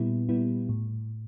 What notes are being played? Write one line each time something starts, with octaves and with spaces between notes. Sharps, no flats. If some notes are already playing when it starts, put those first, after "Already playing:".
Already playing: A#2 G3 B3 E4
A#2 G3 B3 E4
A2